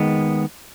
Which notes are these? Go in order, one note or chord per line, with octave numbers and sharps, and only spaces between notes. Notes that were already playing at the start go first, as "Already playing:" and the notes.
Already playing: D#3 G#3 B3